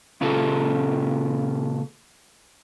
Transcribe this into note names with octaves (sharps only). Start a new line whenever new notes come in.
A#2 C#3 C#4 F4 G4 A4